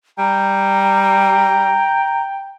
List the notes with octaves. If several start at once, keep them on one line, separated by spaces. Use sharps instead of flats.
G3 G5 A#5